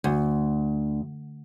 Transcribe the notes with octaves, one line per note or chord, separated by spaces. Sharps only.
D2